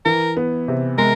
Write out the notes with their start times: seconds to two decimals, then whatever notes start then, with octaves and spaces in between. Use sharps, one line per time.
0.05 E3 A#4
0.37 B3
0.68 C3
0.98 G#3 A#4